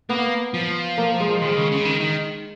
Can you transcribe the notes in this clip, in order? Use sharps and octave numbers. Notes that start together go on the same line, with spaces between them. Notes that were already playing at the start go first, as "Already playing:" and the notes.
A#3 B3
F3
A#3
G#3
D#3 G#3
C#3
C#3
D#3
D#3